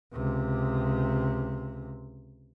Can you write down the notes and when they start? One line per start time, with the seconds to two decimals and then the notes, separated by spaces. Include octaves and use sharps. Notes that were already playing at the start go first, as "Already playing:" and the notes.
0.12 C#2 C3